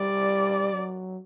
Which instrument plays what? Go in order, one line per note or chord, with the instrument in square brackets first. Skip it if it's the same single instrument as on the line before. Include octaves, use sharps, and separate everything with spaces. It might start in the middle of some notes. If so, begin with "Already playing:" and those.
Already playing: [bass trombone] G3 [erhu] D5
[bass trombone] F#3